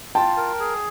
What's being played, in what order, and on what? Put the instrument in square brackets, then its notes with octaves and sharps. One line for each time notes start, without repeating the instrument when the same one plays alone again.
[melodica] F4 [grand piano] G5 A5
[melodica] A#4
G#4